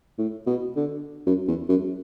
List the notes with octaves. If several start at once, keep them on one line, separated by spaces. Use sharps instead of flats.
A2
B2
D3
F#2
E2
F#2